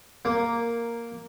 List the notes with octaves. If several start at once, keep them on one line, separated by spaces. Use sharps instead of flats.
A#3